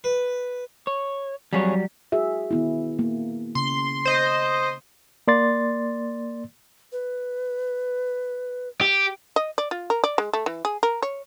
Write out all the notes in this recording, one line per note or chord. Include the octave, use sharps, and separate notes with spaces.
B4
C#5
F2 F#3 G3 G#4 C#5
F#4 G#4 E5
D#3 B3 E4
A#3
C#3 C6
C5 D#5
A#3 D5 C6 A6
B4
G4
D#5
D5
F4
A#4
D5
G#3
A3
E3
G#4
A#4
C#5